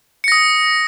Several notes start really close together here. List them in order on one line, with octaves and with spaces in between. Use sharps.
C#7 A#6 D#6